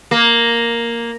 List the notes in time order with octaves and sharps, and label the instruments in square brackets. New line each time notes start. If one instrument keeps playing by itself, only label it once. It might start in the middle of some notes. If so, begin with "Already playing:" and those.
[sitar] A#3